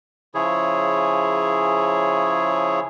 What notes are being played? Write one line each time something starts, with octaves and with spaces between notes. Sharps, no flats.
C#3 F3 E4 G#4 C#5